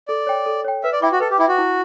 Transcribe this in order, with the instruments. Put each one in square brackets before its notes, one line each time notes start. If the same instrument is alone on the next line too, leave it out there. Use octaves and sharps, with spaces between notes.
[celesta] A4 [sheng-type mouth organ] D5
[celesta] C#5 G5
A4
C#5 G5
[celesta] B4 [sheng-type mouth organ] E5
[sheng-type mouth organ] D5
[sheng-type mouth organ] E4 [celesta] E5 G5 D6
[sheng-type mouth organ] F#4
[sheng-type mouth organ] A4 [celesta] B4
[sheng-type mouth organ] G4
[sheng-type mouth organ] E4 [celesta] E5 G5 D6
[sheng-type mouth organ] F#4
[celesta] E4